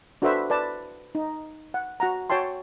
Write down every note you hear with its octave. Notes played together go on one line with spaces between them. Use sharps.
D4 F#4 A4 B4 C5 E5
B4 D5 A5
D#4
F#5
F#4 F#5 A#5
F#4 C#5 G5 A5 C6